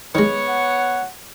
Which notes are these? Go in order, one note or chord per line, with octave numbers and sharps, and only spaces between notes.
D#3 G#3 B3 C#5
F#5